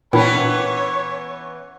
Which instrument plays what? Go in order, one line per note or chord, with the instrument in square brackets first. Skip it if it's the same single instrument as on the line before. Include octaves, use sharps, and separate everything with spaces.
[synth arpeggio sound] A#2 [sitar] E3 B3 C#4 [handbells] D4 E4 G5 [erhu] C#5